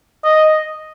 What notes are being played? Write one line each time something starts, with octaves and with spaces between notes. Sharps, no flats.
D#5